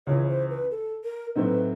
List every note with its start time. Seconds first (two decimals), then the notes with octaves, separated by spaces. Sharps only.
0.07 C#2 C#3 E3 C#5
0.28 C5
0.50 B4
0.71 A4
1.04 A#4
1.35 A2 F#3 A3 C4 D#4 B4